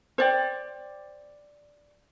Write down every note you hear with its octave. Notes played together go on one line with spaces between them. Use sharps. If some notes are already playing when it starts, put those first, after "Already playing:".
C5 D5 G5